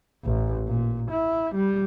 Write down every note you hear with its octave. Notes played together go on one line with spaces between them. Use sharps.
A1
A#2
E4
G3